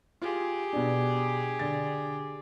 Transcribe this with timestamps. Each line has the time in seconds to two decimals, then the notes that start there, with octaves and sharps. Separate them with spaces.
0.22 F4 G4 G#4
0.73 B2 D4
1.59 D3 A6